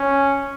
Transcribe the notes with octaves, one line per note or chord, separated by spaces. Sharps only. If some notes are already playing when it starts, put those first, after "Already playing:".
Already playing: C#4